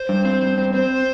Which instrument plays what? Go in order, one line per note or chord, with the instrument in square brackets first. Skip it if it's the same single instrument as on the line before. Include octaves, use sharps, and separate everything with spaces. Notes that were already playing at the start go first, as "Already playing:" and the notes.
Already playing: [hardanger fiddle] C5
[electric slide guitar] G2
C4
G2
C4
[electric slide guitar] C4 [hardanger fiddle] C5